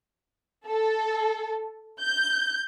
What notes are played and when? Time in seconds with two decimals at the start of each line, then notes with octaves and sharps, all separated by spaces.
0.68 A4
2.01 G6